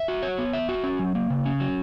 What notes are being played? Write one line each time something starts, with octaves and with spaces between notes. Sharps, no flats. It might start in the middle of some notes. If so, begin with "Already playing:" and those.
Already playing: E5
F#4
C#5
B3
E5
F#4
C#4
F#3
A#3
C#3
C#4
F#3